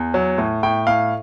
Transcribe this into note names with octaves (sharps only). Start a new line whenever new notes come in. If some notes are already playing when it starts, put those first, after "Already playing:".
Already playing: E2
F#3
A2
A2 G5
A2 F5